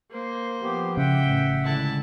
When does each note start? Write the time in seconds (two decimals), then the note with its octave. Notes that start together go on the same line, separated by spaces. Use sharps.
0.11 A#3 C5
0.62 F3 B3 G4
0.97 C#3 E5 F#5 G5
1.27 A1
1.65 D3 G#3 E4 A5